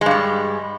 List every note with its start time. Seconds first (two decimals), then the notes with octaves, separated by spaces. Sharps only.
0.01 G#3
0.06 G2
0.11 G3